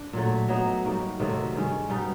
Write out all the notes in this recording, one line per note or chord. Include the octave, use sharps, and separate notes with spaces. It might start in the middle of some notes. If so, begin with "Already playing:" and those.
Already playing: D4
A#2 F#3 A3
F#3 B3 D#4
G3 A#3 D#4 F#4
C3 D#3 F#3 A3
G2 D#3 G#3 C#4
B2 G3 B3 D#4